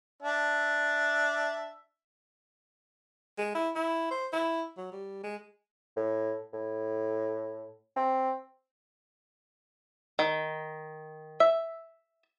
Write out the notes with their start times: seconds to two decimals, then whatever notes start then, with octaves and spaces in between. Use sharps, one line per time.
0.22 D4 E5
3.38 G#3
3.55 E4
3.76 E4
4.11 C5
4.33 E4
4.77 F#3
4.92 G3
5.24 G#3
5.97 A2
6.53 A2
7.96 C4
10.19 D#3
11.40 E5